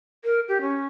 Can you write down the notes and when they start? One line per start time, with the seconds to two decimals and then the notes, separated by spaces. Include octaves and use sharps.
0.24 A#4
0.48 G4
0.61 C#4